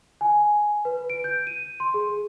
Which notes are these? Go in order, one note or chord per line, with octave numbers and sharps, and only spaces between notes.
G#5
B4
D7
G6
D#7
C6
G#4